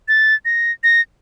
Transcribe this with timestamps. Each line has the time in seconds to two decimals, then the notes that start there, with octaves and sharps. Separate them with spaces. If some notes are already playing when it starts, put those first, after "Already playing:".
0.08 A6
0.45 A#6
0.84 A#6